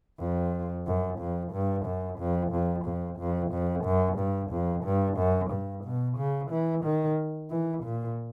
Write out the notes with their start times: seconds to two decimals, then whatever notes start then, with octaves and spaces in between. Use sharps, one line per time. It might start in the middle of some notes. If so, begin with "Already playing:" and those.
0.20 F2
0.87 F#2
1.20 F2
1.53 G2
1.86 F#2
2.19 F2
2.52 F2
2.86 F2
3.19 F2
3.52 F2
3.85 F#2
4.19 G2
4.52 F2
4.85 G2
5.18 F#2
5.51 G2
5.85 B2
6.18 C#3
6.51 E3
6.85 D#3
7.51 E3
7.84 A#2